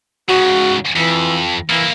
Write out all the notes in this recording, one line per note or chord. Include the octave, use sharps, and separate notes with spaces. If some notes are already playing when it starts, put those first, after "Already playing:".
G#2 C#3 F#4
F2 E3
E3 A#3 E4